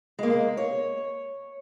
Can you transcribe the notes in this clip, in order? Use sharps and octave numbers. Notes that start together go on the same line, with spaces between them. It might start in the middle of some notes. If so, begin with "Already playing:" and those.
G#3 A#3
C#5